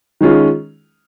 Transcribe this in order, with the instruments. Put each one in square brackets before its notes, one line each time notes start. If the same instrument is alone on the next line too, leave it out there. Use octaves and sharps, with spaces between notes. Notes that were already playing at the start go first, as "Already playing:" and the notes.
[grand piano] D#3 G#3 C#4 F4